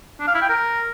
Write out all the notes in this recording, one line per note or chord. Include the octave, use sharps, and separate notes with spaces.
D4
F5
E4
G5
A#4